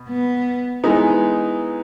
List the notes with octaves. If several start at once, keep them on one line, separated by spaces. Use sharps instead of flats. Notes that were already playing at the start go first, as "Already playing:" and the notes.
Already playing: B2
B3
E3 G#3 B3 D#4